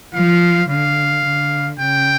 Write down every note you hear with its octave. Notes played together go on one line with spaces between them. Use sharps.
F3 F5
D3 F5
D3
C#3 G5